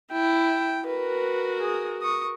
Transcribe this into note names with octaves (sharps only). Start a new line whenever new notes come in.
E4 G5
F#4 A#4 B4
G#4 D#6
C#6 D#6